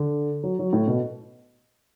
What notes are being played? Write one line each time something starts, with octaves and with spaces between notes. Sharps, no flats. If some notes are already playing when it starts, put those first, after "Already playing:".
Already playing: D3
F#3
F#3
A2
B2